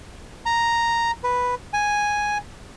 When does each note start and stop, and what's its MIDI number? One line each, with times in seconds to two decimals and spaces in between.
0.46 1.11 82
1.24 1.55 71
1.73 2.38 80